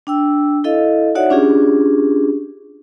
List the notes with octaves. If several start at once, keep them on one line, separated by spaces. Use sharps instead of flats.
D4 G5 E6
E4 A4 D#5 F5
D#4 F#4 C#5 D5 E5 F#5
C#4 D4 F4 G4 G#4